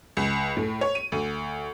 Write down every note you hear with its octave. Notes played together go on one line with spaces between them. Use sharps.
C#2
A2
C#5
D#7
D2